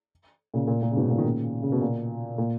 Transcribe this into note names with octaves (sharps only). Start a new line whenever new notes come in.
A#2 C#3
A#2
A#2
C#3
G#2 B2
A#2 C#3
D#3
A#2 C#3
C#3
B2
A#2
A#2